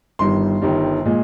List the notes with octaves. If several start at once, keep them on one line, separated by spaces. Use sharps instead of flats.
G1 G2 D#3 G3 C6
G1 G2 D#3 G3
A#2 G#3